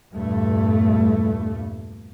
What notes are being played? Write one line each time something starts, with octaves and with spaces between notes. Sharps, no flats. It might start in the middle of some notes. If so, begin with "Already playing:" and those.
E2 G2 A#2 A3